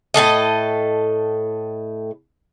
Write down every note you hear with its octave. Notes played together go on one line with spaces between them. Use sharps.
A2 G#3 A4 D#5